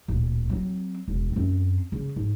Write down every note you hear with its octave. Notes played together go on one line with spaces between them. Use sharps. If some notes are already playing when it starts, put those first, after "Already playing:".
D1 A#2
F#3 C4
E1
F#2 C4
C#3
G#2